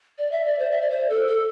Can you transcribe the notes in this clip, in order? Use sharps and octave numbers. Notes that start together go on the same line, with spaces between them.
D5
E5
D5
C5
E5
D5
C5
A4
A4